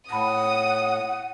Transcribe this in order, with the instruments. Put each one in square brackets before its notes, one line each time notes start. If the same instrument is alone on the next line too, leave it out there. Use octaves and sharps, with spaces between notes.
[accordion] A2 [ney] F#5 [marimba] A5 B5 [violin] D#6